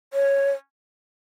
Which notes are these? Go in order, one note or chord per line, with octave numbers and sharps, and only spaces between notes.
C#5